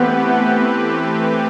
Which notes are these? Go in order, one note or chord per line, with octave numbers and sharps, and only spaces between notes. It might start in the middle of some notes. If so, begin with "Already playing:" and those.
Already playing: E3 A3 B3 C4 G4 B4